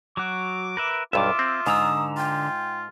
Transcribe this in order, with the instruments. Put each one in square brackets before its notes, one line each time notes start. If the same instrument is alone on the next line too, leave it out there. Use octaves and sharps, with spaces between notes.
[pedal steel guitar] F#3 F#4 [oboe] D6
[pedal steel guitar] A#4 B4 E5
[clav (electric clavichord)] B1 G2 [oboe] F4 [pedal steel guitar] E5 D6
[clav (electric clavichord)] C4
[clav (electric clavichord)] G#2 [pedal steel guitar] D3 A#5 E6 [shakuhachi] D#6
[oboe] F4 [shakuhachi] G5